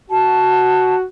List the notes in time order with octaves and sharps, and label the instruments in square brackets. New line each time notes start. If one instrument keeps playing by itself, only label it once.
[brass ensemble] F#4 [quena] A5